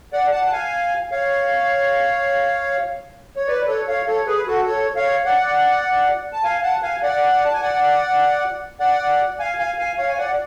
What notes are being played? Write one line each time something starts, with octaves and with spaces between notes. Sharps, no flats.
D5 F#5
F#5 A5
A5
F5 G#5
C#5 F5
C#5
B4 D5
A4 C#5
C#5 F5
A4 C#5
G#4 B4
F#4 A4
A4 C#5
C#5 F5
D5 F#5
A5
F5 G#5
F#5 A5
F5 G#5
D5 F#5
A5
G#5
D5 F#5
D5 F#5
F5 G#5
F5 G#5
F5 G#5
C#5 F5
G#5
D5 F#5